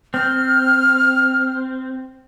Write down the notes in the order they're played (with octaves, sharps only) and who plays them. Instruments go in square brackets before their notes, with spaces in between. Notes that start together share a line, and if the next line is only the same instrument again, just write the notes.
[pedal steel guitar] C4 [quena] F6